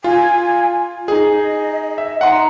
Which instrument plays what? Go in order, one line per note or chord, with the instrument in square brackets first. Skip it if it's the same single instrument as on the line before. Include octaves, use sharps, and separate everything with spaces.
[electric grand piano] F4 [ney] G#5
[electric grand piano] D#4 G#4 [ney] D#5
[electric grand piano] E5
[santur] D#4 A#5 [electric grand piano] F#5 C6